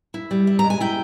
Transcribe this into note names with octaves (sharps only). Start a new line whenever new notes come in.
E4
G3
E4
G#3 A#5
G#5
E4 G5